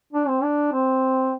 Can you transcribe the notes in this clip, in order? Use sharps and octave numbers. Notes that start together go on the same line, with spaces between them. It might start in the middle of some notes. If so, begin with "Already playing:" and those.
D4
C4
D4
C4